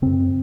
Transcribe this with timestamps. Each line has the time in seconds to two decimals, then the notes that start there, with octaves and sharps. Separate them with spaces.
0.02 F#2 C#3 C4